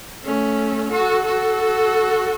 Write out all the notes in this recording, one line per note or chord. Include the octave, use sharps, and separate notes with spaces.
A3 C#4
F#4 A4
F#4 A4